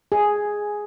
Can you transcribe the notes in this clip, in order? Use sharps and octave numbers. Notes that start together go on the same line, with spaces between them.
G#4